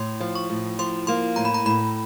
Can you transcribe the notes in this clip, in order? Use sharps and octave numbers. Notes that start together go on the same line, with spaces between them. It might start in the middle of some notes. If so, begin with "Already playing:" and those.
Already playing: A2 C6
F3
C#6
A2
F3 C6
A#3 C6
A2 A#5
B5
A#5
A2 B5